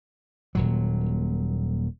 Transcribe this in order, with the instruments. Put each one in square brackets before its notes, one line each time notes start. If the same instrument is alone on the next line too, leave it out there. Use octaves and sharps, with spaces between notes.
[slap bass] D#1 A#2 F#3